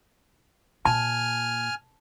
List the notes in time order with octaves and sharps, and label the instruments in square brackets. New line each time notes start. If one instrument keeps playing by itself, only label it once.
[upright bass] A#2 [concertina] G#5 F6 [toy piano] A5